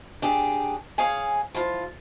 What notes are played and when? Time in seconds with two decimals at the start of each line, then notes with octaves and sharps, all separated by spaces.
0.22 D4 G4 G#4
0.98 G#4 C#5 F5 G#5
1.55 F3 E4 F4